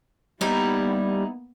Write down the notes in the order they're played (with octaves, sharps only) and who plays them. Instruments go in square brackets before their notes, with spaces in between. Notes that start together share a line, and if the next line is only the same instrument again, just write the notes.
[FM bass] G3 [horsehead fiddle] A#3 B3 [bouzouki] D#4 E4